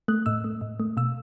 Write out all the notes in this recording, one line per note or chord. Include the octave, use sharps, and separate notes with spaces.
A3 F#6
A2 E6
A3
A2
A3
B2 E6